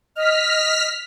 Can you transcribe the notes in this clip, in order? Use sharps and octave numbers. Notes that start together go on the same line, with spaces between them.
D#5 F6 B6